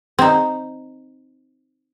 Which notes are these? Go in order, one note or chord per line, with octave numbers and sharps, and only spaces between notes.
C4 D#4